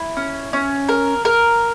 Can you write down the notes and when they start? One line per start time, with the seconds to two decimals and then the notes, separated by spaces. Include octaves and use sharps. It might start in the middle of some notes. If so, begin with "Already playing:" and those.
Already playing: E4
0.17 C#4
0.53 C#4
0.89 A#4
1.25 A#4